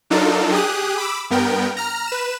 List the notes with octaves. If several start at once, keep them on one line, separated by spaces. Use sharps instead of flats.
F#3 D4 D#4 F4 A4 A#4
G4 G#4 D#6 F#6
B5 D6 E6
G2 B3 A#4 G5
A#5 F6
B4 E7